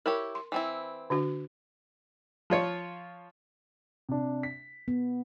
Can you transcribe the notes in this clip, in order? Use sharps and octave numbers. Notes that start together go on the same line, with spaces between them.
E4 G4 A#4 C#5
C6
E3 C4 E4
D3 D4 F#4
F3 F4 C#5
C3 D4
B6
B3